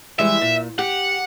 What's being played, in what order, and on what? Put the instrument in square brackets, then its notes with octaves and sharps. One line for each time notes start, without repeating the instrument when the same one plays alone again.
[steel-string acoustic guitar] E3 G3 G#3 [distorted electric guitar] E5
[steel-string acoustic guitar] A#2
[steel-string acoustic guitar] G4 [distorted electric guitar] F#5